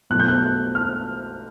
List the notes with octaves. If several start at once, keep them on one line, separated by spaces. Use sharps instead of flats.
B1 B2 F#3 A3 F#6
G6
F#6
F6